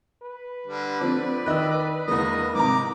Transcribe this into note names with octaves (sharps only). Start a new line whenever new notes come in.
B4
D3 G3
D3 F3 C4 D5
D#3 D#5 E6 F#6
E2 D3 E3 G#3 A#3 D#5
G#2 C3 A#4 A#5 D6